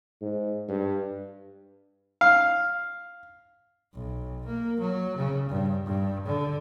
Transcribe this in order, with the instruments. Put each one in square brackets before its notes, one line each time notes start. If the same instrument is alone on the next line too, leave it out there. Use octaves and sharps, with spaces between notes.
[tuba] G#2
G2
[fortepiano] F5
[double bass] B1
A#3
F#3
C#3
G2
G2
D3